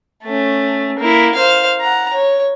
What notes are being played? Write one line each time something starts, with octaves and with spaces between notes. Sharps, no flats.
A3 C#4
A#3 E4
C5 F5
F#5 A#5
C#5